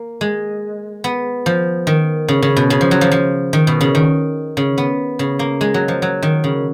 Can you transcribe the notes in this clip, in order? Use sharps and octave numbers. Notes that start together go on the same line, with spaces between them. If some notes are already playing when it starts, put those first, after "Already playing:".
Already playing: A#3
G#3
B3
F3
D#3
C#3
C#3
B2
C#3
F3
F#3
F3
F3
D#3
B2
C#3
D#3
C#3
B3
C#3
A#3
G#3
F#3
F3
F#3
D#3
C#3